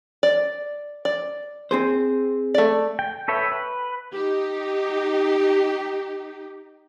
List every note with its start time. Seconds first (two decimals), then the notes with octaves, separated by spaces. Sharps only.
0.23 D5
1.05 D5
1.71 C4 G#4 C5
2.54 A3 D5
2.99 G5
3.28 A4 B4 C#5 E5 G5
3.52 B4
4.13 D#4 G4